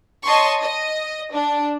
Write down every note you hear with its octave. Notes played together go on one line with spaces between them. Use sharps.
C#5 D#5 A5 C6 C#6
D#5
D4